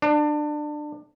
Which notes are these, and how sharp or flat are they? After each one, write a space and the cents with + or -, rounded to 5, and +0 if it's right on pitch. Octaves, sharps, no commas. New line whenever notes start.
D4 +25